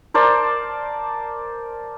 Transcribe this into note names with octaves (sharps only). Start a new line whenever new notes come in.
A#4 C5 D5 A5